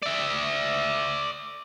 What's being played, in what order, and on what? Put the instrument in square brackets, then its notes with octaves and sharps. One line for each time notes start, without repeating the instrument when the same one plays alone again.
[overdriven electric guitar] D5 E5